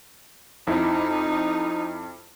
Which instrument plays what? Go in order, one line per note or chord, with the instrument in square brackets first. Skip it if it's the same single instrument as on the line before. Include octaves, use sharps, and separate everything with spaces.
[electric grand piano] F2 E4 [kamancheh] D#4